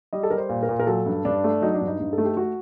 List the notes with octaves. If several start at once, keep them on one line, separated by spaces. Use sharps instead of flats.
G3 D#5
A4
G3 A#4
C5
A#2
A#4
A#2
A#4
F#3 A4
G2
G2 D4
A3
F#3 D#4
D4
G2
D#4
G2
A4
A3
G4
A3 F#4